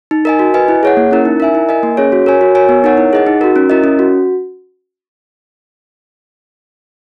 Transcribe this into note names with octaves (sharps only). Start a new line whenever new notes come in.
D#4
A#4 D#5 G#5
F#4
B4 D#5 G#5
E4
G#4 C#5 F#5
A#3
C#4 E4 A#4
D#4
A#4 E5 G#5
E4
A#4 D#5 G#5
A#3
C#4 G#4 C#5
F#4
A#4 C#5 G#5
F#4
A#4 C#5 G#5
B3
D#4 A#4 C#5 F#5
E4
G#4 D#5 F#5
D#4
F#4 A#4
C#4
E4 A#4 D#5
C#4
F#4